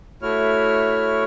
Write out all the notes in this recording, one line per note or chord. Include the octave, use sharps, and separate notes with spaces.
A3 E4 F#4 C#5 F6